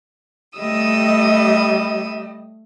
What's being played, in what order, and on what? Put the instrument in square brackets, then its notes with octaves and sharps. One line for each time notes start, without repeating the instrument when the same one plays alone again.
[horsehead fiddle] G3 D#5 [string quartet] A3 D#6 E6